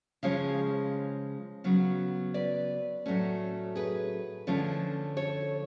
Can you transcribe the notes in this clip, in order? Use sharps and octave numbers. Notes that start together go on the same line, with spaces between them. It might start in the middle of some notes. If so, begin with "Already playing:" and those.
C#3 F3 G#3 C#4 C#5 F5
C#3 F#3 B3
B4 D5
A2 F#3 A3 C#4
G#4 B4
D3 F3 A3 C#4
A4 C#5